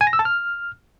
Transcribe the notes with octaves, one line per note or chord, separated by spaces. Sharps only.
G#5
A#6
E6
A5
F6